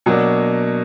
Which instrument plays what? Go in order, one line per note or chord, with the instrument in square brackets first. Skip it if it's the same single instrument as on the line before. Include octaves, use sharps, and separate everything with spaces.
[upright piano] B2 F#3 A#3 D4